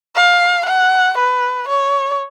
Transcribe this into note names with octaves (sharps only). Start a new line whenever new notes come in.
F5
F#5
B4
C#5